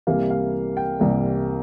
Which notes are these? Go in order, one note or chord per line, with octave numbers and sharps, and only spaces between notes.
C2 C3 E3 G3 A#3 F5
F5
G5
C2 C3 E3 G3 A#3